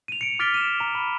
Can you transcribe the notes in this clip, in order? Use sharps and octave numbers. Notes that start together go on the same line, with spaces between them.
D#7 F7
C#7 D7
D6 F6 A6 B6 D7 G7
D#7 E7
A#5
B5